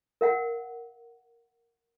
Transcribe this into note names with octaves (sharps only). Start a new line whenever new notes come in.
A#4 F5 F#5